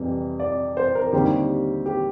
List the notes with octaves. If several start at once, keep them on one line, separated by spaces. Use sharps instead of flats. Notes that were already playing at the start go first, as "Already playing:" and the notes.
Already playing: F2 C3 E3 G3
D5
C5
A#4
D#2 D3 G3 C4 G4
G4